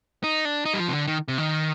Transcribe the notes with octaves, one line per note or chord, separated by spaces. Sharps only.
D#4
D4
D#4
G3
F3
C3
D3
D#3
C3
D#3